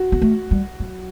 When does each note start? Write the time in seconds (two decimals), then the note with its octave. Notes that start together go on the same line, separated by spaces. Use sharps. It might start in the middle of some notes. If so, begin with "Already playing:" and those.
Already playing: F#4
0.12 B3
0.22 A3
0.51 G3
0.80 F#3